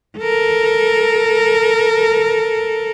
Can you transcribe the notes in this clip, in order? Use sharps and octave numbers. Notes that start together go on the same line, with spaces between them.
A4 A#4